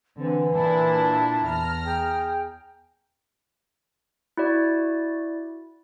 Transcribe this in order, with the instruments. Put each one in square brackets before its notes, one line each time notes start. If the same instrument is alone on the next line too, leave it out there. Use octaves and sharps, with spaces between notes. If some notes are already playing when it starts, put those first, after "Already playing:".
[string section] D3 [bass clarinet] E3 [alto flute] C4
[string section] A#2 D4 E4 [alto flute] A5
[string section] E2 A#5 F6
[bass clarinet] G#4 [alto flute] G5
[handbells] E4 F#4 D5